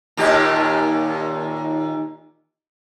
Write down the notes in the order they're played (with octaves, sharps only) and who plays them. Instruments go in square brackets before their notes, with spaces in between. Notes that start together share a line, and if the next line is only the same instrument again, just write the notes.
[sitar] D#2 A#2 G4